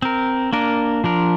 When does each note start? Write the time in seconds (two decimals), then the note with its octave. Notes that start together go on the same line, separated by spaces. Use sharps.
0.02 C4 A#4
0.53 A#3 D4 A#4
1.04 F3 D4 A#4